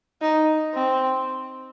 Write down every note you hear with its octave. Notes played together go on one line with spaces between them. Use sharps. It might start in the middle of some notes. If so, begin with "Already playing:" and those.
D#4
C4